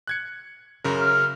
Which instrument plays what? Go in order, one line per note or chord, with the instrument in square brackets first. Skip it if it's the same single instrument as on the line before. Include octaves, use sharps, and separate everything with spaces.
[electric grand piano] F#6 G#6 C#7
F#2 C#3 A#4
[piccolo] F6